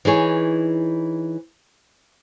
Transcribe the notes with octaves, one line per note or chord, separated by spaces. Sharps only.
E3 D#4 G#4 C#5